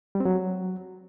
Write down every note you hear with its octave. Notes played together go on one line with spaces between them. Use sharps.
G3
C4
F#3